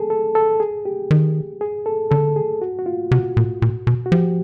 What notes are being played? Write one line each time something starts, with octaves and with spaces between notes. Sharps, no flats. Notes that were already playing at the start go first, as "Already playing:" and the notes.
Already playing: G#4 A4
A4
A4
G#4
G4
D#3
G#4
A4
D3 A4
G#4
F#4
F#4
F4
C3 F#4
A#2
A#2
B2
F#4
F3 G4